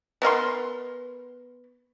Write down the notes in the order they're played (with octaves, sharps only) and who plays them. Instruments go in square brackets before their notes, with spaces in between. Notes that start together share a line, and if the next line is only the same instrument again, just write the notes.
[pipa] B3 A#4 E5 C6